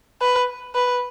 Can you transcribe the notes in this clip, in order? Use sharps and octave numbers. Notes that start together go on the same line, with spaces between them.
B4
B4